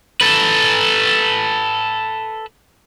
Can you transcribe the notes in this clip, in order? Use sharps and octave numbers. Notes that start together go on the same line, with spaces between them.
A4 B4